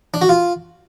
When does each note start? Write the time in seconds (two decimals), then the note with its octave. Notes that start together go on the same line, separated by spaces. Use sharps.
0.14 D4
0.21 F#4
0.29 F4